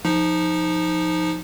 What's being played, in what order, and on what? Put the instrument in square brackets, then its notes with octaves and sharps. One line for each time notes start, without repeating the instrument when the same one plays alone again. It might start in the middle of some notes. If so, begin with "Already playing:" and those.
[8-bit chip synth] F3 D#4